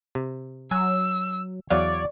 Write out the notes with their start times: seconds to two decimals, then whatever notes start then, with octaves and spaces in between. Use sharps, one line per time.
0.15 C3
0.71 F#3 G#5 E6
1.70 E2 F#3 C#5 D5 F5